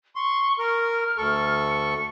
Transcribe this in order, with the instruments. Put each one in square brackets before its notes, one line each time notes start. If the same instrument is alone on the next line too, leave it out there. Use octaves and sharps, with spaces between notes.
[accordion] C6 [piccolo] C#6
[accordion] A#4 [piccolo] F6
[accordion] D2 A4 C#6
[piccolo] C#7